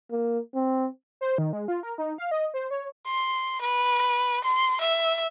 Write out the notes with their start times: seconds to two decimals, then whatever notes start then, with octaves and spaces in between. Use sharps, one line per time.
0.11 A#3
0.55 C4
1.21 C5
1.38 D#3
1.53 G#3
1.68 F4
1.83 A#4
1.98 D#4
2.18 F5
2.31 D#5
2.54 C5
2.71 C#5
3.06 C6
3.62 B4
4.44 C6
4.81 E5